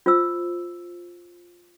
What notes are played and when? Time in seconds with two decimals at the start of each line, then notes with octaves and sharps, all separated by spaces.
0.06 F4 C5 E6